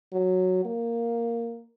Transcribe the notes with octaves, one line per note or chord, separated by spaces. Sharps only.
F#3
A#3